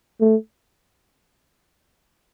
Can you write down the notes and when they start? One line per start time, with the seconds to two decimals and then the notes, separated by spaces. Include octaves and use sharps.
0.21 A3